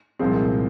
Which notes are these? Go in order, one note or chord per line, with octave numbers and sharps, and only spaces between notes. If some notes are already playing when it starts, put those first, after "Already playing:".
C2 A#2 F3 G#3 C4